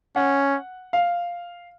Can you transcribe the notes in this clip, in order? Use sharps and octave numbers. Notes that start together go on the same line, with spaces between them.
C#4 F#5
F5